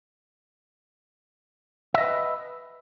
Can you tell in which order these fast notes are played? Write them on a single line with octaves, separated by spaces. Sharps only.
E5 D#5 B4